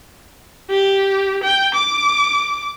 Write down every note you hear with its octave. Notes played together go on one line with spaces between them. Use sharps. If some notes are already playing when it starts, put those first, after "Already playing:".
G4
G5
D6